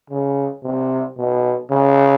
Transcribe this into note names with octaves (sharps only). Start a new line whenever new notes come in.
C#3
C3
B2
C#3